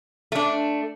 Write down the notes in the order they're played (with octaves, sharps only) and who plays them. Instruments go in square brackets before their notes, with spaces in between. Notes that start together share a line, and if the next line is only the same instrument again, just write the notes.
[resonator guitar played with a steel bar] A3 D4